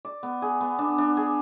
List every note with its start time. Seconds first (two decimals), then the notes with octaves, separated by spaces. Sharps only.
0.05 D5
0.23 B3
0.42 G#4
0.61 B3
0.79 D4
0.98 D4
1.17 G#4